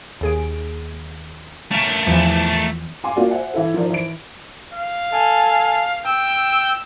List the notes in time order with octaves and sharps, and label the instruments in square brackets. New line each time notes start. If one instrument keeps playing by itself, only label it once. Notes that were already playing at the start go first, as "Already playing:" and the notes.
[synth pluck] D#2 G#4 D7
[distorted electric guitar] A3 A#4 [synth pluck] C#4
[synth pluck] E2 E3 F3
[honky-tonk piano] F5 G#5 C6 D6
A#3 F4 F#4 D5 F#5
C5 E5 F#5 G#5
E3 E4 A4
F3 D#4 A#4 C5 D5
E3 D7
[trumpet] F5
[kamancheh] A4 G#5
[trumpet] G5 [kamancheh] E6